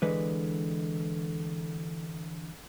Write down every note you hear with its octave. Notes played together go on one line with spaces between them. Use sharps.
D3 E3 G#3 B4